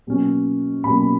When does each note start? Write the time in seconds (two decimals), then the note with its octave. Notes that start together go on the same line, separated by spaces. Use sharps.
0.07 B2 F#3 A#3 C#4
0.84 B2 F#3 A#3 C#4 B5